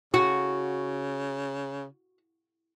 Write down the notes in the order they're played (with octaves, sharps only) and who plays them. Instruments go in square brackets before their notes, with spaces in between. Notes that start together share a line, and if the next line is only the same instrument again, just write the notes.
[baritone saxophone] C#3 [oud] F#4